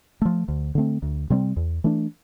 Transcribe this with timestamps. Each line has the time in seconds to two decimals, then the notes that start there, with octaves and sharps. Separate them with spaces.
0.22 F3 A3
0.48 D2
0.75 D3 A3 C4
1.02 D2
1.30 C3 G3 C4
1.56 E2
1.84 E3 A3 D4